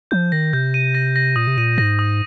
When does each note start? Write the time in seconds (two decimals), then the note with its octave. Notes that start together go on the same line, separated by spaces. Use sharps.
0.11 F3 G6
0.32 D#3 A#6
0.53 C3 G6
0.74 D#7
0.95 A#6
1.16 A#6
1.36 A#2 D#6
1.47 C3
1.57 A#2 D#7
1.78 G#2 A#6
1.99 D#6